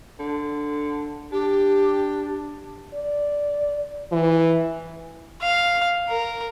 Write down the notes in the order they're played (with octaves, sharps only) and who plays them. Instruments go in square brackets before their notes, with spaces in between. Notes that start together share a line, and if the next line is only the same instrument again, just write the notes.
[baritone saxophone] D3
[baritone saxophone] D4 [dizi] G4
[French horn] D5
E3
[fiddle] F5
A#4